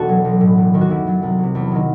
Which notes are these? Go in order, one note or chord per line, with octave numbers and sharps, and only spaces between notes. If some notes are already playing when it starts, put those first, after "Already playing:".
Already playing: E1 F#4 A4
B2 F#3
B1
A2 F#3
E1
D#2 D#3 F#3
F#4
F#1 E4
F#2 F#3
C2
C3 F#3
E2
D#3 F#3